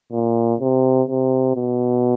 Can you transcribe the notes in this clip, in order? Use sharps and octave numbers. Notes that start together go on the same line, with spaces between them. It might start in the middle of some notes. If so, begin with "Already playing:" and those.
A#2
C3
C3
B2